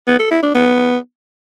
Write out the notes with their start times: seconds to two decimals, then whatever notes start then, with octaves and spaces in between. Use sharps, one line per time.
0.07 B3
0.19 A4
0.31 E4
0.42 D4
0.54 B3